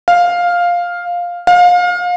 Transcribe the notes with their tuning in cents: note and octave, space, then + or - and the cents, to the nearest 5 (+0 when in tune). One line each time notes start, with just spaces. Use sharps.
F5 +5
F5 +30